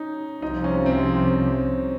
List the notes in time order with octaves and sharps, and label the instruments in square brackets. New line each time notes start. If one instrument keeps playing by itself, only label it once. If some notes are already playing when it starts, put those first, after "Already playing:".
Already playing: [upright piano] C#4 D#4
[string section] C2 C3 F3 [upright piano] D#4
[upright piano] C#4
C4